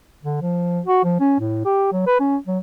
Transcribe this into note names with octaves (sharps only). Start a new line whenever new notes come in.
D3
F3
F#4
F3
C#4
A2
G4
F#3
B4
C#4
F#3